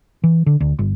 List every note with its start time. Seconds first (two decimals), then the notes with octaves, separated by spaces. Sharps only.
0.24 E3
0.46 D3
0.60 D2
0.79 G1